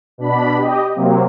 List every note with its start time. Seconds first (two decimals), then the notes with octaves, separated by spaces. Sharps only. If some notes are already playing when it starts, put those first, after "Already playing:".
0.18 B2 D4 B5
0.56 G4 D#5
0.95 C3 F#3 A#3 C4